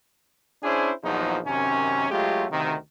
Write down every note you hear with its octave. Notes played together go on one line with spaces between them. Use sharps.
C#4 D4 E4 G#4 C5
A#1 E2 F3 F#3 D#4
F#2 C3 D#3 C#4
F#3 G#3 A3 F4 G4
D2 C3 D#3